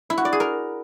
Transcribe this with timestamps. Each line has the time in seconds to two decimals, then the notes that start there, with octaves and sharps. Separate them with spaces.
0.10 E4
0.18 F#4
0.25 D5
0.33 G#4
0.40 A#4